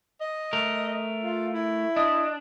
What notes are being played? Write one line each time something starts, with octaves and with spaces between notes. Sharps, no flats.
D#5
A3 A#4
F4
E4
D4 D#5